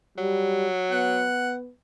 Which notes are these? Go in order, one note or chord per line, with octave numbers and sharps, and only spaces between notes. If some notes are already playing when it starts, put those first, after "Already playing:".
F#3 G3
B3 F#5